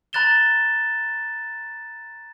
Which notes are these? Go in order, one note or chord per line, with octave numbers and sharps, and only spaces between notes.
A#5 B5 F#6 A6 E7 G7